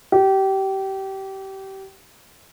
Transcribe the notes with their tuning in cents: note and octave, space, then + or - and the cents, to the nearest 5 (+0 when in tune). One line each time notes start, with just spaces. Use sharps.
G4 -25